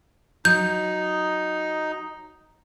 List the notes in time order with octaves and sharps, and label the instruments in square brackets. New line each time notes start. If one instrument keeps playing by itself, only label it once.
[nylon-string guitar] F#3 [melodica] D#4 [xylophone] G6